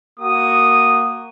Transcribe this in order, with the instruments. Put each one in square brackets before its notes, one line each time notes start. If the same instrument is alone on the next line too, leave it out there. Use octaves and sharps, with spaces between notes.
[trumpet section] A#3 F#4 D#6